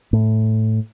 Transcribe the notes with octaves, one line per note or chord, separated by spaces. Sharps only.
A2